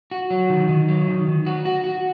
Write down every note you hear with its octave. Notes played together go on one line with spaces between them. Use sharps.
F#4
F#3
D#3
D#3
F#3
D#3
D#3
F#4
F#4
F#4